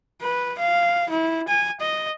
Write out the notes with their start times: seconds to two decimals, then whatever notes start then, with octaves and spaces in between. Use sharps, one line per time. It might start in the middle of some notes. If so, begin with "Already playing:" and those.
0.22 B4
0.59 F5
1.09 E4
1.48 G#5
1.80 D#5